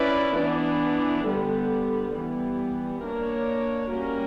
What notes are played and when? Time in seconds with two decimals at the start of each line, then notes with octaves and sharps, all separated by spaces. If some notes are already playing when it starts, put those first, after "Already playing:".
Already playing: C#4 E4 B4 D5
0.38 E3 B3 D4
1.27 D3 G3 B3
2.15 E3 G3 B3
3.03 A#3 D4 A#4 C#5
3.90 G3 A#3 C#4 F#4 A#4